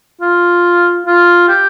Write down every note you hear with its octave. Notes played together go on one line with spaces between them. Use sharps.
F4
F4
G4